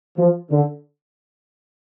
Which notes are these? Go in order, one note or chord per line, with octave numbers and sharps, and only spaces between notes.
F3
D3